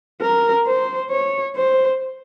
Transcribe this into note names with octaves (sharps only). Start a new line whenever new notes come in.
A#4
C5
C#5
C5